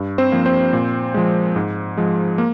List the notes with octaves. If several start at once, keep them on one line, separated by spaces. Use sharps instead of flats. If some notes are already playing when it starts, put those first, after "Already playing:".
Already playing: G2
C4 C5
F3 A#3
C4 C5
A#2
F3 G#3
G#2
F3 G#3
A#3